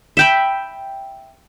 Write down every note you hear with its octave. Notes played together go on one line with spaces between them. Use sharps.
E5 G5 B5